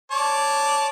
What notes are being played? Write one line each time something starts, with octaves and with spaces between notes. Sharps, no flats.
C#5 D5 A5